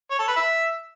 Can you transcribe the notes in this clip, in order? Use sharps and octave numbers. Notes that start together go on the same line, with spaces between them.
C#5
A4
B4
E5